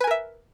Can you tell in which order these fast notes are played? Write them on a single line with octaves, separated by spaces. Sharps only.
B4 G#5 A#4 E5